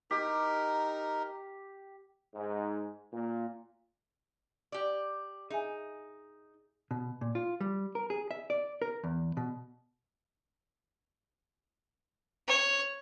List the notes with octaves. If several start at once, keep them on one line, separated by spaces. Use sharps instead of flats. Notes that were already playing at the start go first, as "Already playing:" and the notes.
D#4 G4 A#4
G#2
A#2
G4 D5
D#4 G#4 E5 G#5
B2
A#2
F4
G3
A#4
G#4
E5
D5
A#4
E2
B2
C#5